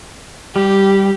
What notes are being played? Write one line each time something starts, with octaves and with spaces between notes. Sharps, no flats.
G3 G4